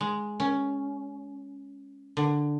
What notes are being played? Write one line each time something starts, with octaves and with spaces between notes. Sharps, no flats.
G#3
C#4
D3